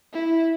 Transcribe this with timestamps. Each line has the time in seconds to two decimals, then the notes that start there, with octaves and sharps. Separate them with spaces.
0.13 E4